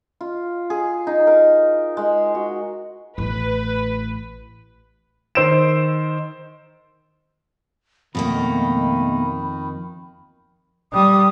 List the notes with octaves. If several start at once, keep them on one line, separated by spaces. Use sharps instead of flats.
F4
G#4
D#4
A#4
G#3
F#4
A1 A3 B4
D#3 C5 E6 D7 E7
F2 B2 D#3 A3 A#3 B5
G3 D#6